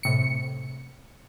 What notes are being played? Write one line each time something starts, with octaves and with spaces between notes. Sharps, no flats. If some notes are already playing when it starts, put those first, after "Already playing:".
A2 C3 C#7